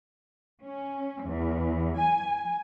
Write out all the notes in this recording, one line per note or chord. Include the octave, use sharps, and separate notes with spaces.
C#4
E2
G#5